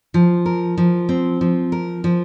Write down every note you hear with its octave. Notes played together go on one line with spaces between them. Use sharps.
F3
A#4
F3
C4
F3
A#4
F3